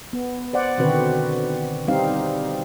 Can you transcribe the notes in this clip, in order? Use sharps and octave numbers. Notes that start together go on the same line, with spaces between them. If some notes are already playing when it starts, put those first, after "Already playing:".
B3
C5 D5 F#5
B2 D3 D#3 C4 F#4 B4
G3 C4 D#4 F5